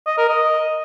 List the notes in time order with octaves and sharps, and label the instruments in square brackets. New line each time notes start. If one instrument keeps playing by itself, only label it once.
[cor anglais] D#5
A#4
D#5